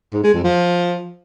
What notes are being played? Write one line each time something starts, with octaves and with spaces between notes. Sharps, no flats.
G#2
G#3
F2
F3